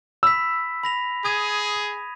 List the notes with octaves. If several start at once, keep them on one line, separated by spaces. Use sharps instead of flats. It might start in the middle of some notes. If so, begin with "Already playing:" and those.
B5 E6 B6
B5 A#6 F7
G#4 D#6 G#6 D#7